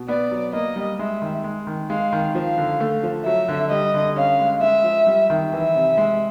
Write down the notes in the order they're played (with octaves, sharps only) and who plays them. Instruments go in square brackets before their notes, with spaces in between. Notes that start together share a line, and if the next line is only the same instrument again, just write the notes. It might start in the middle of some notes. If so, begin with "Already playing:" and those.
Already playing: [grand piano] B2
[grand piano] B3 [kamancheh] D5
[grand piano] F#3
[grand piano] A#3 [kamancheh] D#5
[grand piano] G3
[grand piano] G#3 [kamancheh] E5
[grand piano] D#3
G#3
D#3
[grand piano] G#3 [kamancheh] F5
[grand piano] D#3
[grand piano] F3 [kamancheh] F5
[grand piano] D3
A3
F3
[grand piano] F#3 [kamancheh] E5
[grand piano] D3
[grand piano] G3 [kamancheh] D#5
[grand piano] D3
[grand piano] C#4 [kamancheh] F5
[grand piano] G#3
[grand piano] G#3 [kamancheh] E5
[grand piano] F3
G3
D#3
[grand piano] E3 [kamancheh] E5
[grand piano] C3
G#3